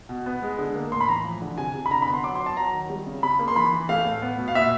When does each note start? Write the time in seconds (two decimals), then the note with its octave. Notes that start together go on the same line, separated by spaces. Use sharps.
0.09 B2
0.26 B3
0.42 G#3
0.59 D3
0.75 A#3
0.91 A2 C6
1.01 B5
1.08 E3 A#5
1.25 F3
1.42 D3
1.58 C3 G#5
1.75 C3
1.86 B5
1.91 D3 A#5
2.02 B5
2.07 B3
2.14 C6
2.24 F#3 D6
2.35 C6
2.40 F#3
2.46 A5
2.57 F#3 A#5
2.73 D#3
2.90 G3
3.07 C#3
3.23 C#3 B5
3.39 A#3
3.48 C6
3.56 E3 B5
3.73 E3
3.89 A3 F5
4.06 A2
4.22 B3
4.38 B2
4.48 F5
4.55 A#2 E5